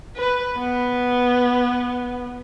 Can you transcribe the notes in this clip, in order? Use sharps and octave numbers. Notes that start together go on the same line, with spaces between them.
B4
B3